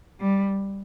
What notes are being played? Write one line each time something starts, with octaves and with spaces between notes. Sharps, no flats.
G3